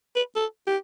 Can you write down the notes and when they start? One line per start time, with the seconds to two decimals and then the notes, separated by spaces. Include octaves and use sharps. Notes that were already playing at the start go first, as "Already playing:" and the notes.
0.16 B4
0.36 A4
0.67 G4